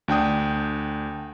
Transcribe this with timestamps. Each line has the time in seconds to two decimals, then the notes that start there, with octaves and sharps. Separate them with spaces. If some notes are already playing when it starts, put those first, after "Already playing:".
0.08 D2 D4 G5 D#6